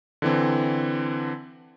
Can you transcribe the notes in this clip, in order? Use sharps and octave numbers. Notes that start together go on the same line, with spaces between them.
D3 E3 C4